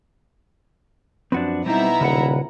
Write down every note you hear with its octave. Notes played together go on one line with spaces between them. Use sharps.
F#2 F3 C4 D4 F#4 B4
B1 G3 B3 C4 D#4 E4 A#5
D#1 C#3 B4 F#5